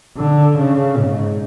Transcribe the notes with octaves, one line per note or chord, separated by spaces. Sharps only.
D3
C#3
G#2